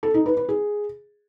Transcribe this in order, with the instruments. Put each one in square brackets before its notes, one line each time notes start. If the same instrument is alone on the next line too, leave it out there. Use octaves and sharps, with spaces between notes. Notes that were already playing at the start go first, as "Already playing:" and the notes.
[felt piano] A4
D#4
B4
B4
G#4